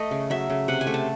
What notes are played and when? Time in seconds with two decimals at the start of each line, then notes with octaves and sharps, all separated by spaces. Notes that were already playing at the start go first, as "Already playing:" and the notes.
Already playing: A3 D#5
0.11 C#3
0.30 F#3 E5
0.50 C#3
0.68 C3 F#5
0.81 G#5
0.87 A3
0.94 A5